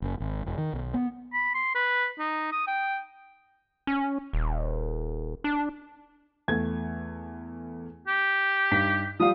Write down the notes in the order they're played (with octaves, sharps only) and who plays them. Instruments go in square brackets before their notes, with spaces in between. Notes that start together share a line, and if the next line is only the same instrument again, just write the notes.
[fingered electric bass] F#1
G#1
E1
D#3
B1
B3
[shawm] B5
C6
B4
D#4
D#6
G5
[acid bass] C#4
D#1
D4
[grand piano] E2 A3 G#6
[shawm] G4
[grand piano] G2 D#4 B6
[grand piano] F3 G3 F5 [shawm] D#6